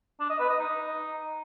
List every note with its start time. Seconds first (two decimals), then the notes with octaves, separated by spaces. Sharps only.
0.20 D4
0.30 D#5
0.40 B4
0.49 D#5
0.59 D#4